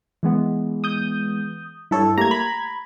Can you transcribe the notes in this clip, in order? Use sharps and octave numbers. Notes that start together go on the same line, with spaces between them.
E3 G#3 B3
D#6 G6
G2 E4 A4 C#5
A3 A#3 G4 A#5 G#6
B5